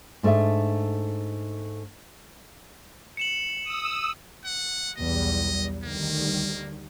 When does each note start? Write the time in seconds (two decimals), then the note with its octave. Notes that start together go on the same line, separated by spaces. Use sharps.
0.23 G#2 A3 D4 D#4 E5
3.17 C#7 E7 F#7
3.64 D#6 E6
4.45 F#5
4.98 B1 E2 G3 D#5
5.84 D2 D#3 G3 A#3